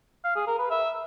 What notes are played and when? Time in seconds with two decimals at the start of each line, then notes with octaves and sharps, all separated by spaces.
0.24 F5
0.36 G#4
0.48 A#4
0.59 B4
0.71 E5